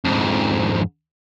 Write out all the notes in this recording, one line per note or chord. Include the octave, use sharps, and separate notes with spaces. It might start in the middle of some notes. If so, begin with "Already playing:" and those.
F2 G#2